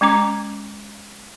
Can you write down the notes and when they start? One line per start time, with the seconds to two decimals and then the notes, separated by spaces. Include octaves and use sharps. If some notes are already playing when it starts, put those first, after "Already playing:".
0.01 G#3 C#4 A#5 D6